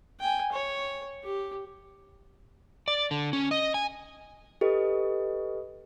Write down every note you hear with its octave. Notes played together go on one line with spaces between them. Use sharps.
G5 G#5
C#5
G4
D5
D3
C#4
D#5
G#5
G4 A4 B4 D#5